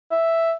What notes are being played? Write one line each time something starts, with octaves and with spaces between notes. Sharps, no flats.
E5